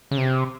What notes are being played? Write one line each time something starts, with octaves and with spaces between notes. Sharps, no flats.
C#3
C3